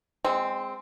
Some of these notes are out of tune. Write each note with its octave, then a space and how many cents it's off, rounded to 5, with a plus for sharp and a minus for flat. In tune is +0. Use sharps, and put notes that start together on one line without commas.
G#3 -20 C4 +0